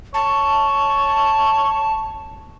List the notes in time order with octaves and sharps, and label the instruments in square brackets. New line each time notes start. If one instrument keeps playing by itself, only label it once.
[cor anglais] C#5 [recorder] A5